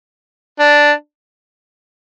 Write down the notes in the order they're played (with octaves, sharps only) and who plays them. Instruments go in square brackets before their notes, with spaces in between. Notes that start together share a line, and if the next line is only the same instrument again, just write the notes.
[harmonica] D4